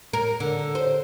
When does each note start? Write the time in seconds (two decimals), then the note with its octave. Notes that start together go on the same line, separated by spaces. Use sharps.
0.13 A#4
0.40 D3
0.75 C5